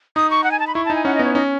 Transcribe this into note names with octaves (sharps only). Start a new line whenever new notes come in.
D#4 D#6
C#6
F#5
G#5
A5
B5
E4 C#6
A5
D#4
G#5
C#4 F#5
D#5
B3 C#5
C#4 D#4